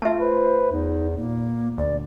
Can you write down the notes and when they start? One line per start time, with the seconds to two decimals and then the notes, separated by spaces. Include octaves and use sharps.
0.02 A3 F4 E5 A5
0.20 B4 C5
0.72 E2 D#4
1.17 A#2 A#3
1.78 D2 D5